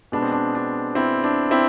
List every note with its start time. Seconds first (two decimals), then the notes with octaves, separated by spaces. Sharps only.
0.12 B2 G#3 B3 D4
0.22 C4
0.32 D4
0.55 D4
0.95 C4 E4
1.24 D4
1.51 C4 E4